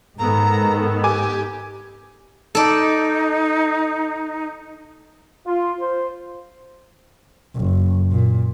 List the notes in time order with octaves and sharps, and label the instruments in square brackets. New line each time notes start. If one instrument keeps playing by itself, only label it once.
[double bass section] G#2 [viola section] D#3 B3 A4 [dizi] A#5
[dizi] G4 [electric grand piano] G#5 D6
[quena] D#4 [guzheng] A4 D5
[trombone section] F4
C5
[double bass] F#1
A#2